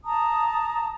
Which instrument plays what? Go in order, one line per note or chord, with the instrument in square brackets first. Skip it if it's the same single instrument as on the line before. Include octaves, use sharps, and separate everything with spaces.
[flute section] A5 A#5 D#6